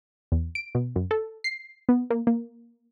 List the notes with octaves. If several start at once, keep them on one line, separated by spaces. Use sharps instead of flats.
E2
D7
B2
F#2
A4
C7
B3
A#3
A#3